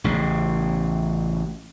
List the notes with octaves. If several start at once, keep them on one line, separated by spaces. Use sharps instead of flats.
A1 C#3